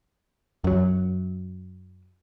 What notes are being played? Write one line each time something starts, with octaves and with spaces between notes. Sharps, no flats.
F#2 F#3